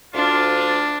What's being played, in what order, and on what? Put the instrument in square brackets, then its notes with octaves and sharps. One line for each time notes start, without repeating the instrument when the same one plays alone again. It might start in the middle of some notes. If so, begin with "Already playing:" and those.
[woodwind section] D2 F4 [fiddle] D4